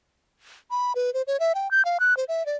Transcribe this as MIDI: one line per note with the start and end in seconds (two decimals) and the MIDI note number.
0.71 0.93 83
0.95 1.13 71
1.14 1.22 72
1.27 1.40 73
1.40 1.53 76
1.55 1.70 79
1.71 1.85 91
1.85 1.98 77
2.00 2.16 90
2.17 2.24 72
2.28 2.45 76
2.46 2.57 74